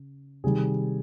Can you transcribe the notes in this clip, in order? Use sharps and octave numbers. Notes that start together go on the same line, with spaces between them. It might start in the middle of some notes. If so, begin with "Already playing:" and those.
Already playing: C#3
C3 D#3 G3 G#4